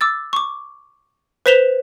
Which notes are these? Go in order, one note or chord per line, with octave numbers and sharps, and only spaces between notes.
D6 E6 A6
C#6 D6
B4 C5 B6 E7 F7 G7